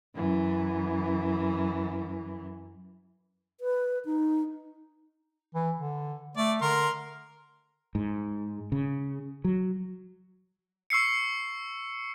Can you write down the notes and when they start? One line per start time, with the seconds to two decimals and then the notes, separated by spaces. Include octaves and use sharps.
0.15 F#2 E3
3.61 B4
4.05 D#4
5.54 E3
5.77 D3
6.37 A3 D5
6.62 D3 A#4 C6
7.95 G#2
8.72 C#3
9.44 F#3
10.90 C#6 E6 C7 C#7